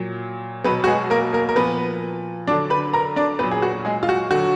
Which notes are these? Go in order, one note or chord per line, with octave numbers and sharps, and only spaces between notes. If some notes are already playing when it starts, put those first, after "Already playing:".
Already playing: A#2 F#3
B2 F#3 B3 B4
F#4
G#3 G#4
A#3 A#4
A#3 A#4
A#4
A#2 F3 B3 B4
D3 F#3 D4 D5
B4 B5
A#4 A#5
D4 D5
A#2 F#3 B3 B4
G#4
F#4
G#3 G#4
F4
F#4
D3 F#3 F#4